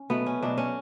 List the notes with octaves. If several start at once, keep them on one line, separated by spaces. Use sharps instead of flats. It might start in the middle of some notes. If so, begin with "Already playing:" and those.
Already playing: C#4
B2 F#3 A3 B3
C#4
B2 F#3 A3 D4
C#4